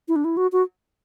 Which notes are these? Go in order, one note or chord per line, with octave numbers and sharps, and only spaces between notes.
E4
D4
E4
F#4
F#4